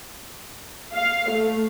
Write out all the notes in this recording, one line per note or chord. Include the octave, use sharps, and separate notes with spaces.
F5
A3